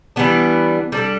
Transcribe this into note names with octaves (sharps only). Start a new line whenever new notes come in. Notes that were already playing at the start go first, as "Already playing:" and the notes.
E3 G3 B3 D4
G3 D4 A4